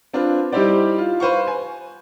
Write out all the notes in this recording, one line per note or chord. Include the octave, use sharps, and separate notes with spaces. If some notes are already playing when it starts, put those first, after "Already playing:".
C4 D4 F4 B4
G3 D#4 E4 G4 C5 D5
F4
B4 C5 F5 C#6
G#5